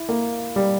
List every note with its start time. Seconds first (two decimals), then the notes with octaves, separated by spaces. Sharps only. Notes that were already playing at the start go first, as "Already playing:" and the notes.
Already playing: E4
0.09 A#3
0.56 G3